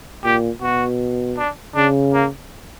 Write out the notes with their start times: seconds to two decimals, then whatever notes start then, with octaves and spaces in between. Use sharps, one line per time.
0.24 A#2 G4
0.62 B2 F#4
1.38 D4
1.75 C#3 D4
2.13 A#3